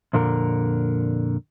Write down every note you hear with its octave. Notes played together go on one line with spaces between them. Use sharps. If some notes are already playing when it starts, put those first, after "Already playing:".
F2 A#2 D3 A#4